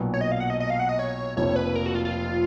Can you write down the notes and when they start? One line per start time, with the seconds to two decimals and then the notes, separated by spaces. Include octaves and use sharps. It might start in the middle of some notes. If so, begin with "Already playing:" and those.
Already playing: B1 A#2 F#3 B3
0.14 C#5
0.21 D#5
0.32 F5
0.40 F#5
0.50 D#5
0.60 D#5
0.70 F5
0.79 F#5
0.89 D#5
0.99 C#5
1.37 F1 F2 F3 A#3 C#5
1.56 B4
1.76 A#4
1.86 F#4
1.95 F4
2.05 F4